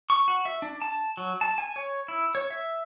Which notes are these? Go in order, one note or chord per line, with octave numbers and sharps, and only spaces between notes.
C#6
F#4
E5
D4
A5
F#3
A5
G#5
C#5
E4
C#5
E5